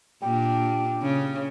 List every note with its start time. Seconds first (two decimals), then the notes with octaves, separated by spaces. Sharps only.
0.22 A#2 D4 G4
1.02 C#3